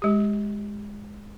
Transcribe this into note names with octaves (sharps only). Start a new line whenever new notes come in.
G#3 G4